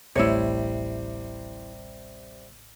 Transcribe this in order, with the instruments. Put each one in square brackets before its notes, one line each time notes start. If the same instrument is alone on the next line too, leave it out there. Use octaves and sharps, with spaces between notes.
[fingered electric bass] D1 A1 A3 [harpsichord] C3 G3 [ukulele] E4 C#5